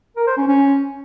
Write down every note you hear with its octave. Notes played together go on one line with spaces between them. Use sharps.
A#4
C5
C#4
C#4